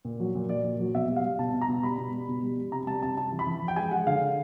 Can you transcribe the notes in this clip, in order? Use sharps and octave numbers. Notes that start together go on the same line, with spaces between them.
A#2
F#3
A#2
F#3 D5
A#2
F#3
B2 E5
G3
F5
G3
B2 A5
B2
A#5
B2
G3 B5
B2
G3
B2
G3
G3
C3 A#5
G3 A5
C3 A5
C3 A5
E3
B5
E3
F3
G5
G#3 G#5
G#3 F#5
D3 F5
D3